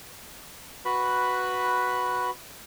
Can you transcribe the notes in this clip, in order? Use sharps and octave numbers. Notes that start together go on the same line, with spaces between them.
F#4 B4 B5 F#6